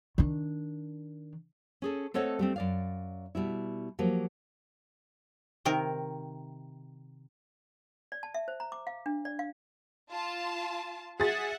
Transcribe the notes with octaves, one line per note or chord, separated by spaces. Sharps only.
D#3 D4
C#4 G#4 A4
A3 C4 A4 C#5 D#5 F#5
G3 A3 C4
F#2 D5 F5
B2 G3 E4
F3 F#3 A#3 G4
C3 D#3 A#4
D5
A5
E5
C5
A#5
D6
F5
D4
D5
F5
F4 A5
G#4 E5 F#5 A6